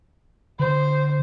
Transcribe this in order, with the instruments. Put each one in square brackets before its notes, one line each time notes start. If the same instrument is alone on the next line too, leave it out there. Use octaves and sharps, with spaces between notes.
[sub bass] D3 [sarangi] C5